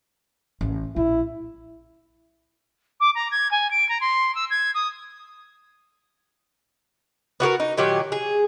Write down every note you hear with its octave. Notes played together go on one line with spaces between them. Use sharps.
A1
A#1 E4
D6
A#5
G#6
G#5
D7
A#5
C6
E6
G#6
D#6
B3 F#4 G4 A#4
D#4
A#2 D#3 F#3 G4
G#4